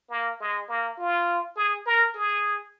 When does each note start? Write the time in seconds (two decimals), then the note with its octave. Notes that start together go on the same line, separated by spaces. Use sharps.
0.10 A#3
0.40 G#3
0.69 A#3
0.98 F4
1.56 G#4
1.86 A#4
2.15 G#4